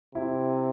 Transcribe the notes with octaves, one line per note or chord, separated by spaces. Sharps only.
C3 E4